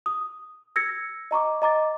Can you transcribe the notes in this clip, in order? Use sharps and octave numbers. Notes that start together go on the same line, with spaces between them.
D#6
E6 G#6 A#6 C#7
D#5 A#5 C#6 D6
D#5 A#5 D6 A6